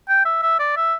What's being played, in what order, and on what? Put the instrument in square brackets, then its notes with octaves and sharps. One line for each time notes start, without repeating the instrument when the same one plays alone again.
[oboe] G5
E5
E5
D5
E5